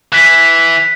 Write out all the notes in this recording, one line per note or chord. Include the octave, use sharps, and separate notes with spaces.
E3 F#6 B6